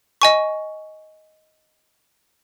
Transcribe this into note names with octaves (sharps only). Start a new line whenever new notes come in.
D#5 G#5 C#6